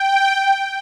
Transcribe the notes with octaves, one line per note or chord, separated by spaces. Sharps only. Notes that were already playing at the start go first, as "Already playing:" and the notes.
Already playing: G5